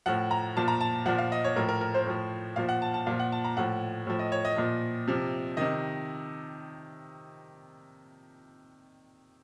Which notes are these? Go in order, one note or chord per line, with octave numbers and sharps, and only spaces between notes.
A2 F3 F#5
A#5
A#2 F3 A5
A#5
A5
A#2 F3 F#5
F5
D#5
C#5
A2 F3 A#4
A#4
A#4
C5
A2 F3
A#2 F3 F5
F#5
A5
A5
A#2 F3 F5
F#5
A5
A#5
A2 F3 F#5
A2 F3
D#5
C#5
D#5
A#2 F3
C3 F3
C3 D#3 D#5